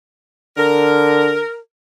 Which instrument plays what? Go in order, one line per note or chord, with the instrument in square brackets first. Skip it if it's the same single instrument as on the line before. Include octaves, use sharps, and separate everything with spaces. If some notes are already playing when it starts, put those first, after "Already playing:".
[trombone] D3 [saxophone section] A#4